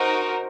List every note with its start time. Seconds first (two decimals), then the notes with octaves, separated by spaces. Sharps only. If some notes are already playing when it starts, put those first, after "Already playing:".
Already playing: D#4 F#4 A#4 C5